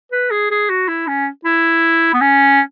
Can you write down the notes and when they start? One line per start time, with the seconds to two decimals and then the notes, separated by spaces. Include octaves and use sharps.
0.12 B4
0.31 G#4
0.51 G#4
0.70 F#4
0.88 E4
1.07 C#4
1.45 E4
2.13 B3
2.21 C#4